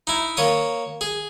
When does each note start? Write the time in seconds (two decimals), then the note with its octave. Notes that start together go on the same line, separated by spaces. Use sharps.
0.07 D#4 E4
0.37 A#3 C#5 D#6
1.01 G#4